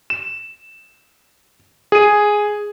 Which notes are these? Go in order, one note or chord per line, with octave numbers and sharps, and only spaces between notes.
E7
G#4 D#7